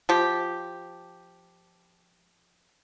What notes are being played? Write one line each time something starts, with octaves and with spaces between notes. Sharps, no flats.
F3 G4